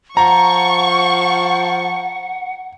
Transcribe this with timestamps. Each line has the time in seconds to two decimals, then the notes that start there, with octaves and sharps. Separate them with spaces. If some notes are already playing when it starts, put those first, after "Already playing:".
0.17 F3 F#5 A#5 C#6